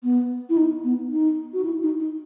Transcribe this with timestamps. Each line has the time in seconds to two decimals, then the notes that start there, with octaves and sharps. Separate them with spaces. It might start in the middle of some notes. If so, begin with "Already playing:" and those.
0.04 B3
0.50 E4
0.57 D#4
0.84 B3
1.11 D#4
1.54 F#4
1.65 E4
1.83 D#4
2.00 D#4